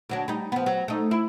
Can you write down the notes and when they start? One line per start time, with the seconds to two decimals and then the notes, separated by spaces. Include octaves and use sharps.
0.09 D2 F#3 D4
0.28 G3 D#4
0.52 F3 B3
0.66 F#3
0.88 A3 D#4
1.11 E4